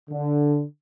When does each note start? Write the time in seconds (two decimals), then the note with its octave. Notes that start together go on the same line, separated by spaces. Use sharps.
0.10 D3